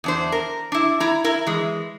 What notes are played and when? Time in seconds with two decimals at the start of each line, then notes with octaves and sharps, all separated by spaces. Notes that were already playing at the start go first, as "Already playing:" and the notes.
0.04 E2 D4 C5
0.32 A#4
0.72 D4 E4
1.00 E4 A#5
1.24 E4 A#4
1.47 E3 G#3